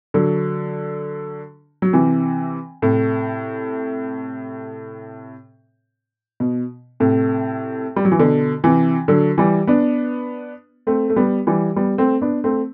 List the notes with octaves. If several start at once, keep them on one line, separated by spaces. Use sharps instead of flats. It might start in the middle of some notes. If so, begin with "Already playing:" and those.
D3 F#3
F#3
C3 E3
A2 C3
B2
A2 C3
G3
F#3
E3
B2 D3
C3 E3
D3 F#3
E3 G3
B3 D4
A3 C4
A3
G3 B3
E3 G3
G3 B3
A3 C4
B3 D4
A3 C4